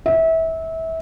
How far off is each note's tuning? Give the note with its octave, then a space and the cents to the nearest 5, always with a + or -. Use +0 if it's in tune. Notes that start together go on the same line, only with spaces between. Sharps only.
E5 -25